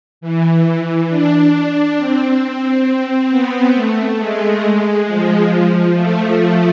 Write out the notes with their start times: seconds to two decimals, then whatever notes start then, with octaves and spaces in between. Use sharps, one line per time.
0.21 E3
1.09 D4
1.97 C4
3.30 B3
3.74 A3
4.19 G#3
4.63 G#3
5.07 F3
5.51 F3
5.95 A3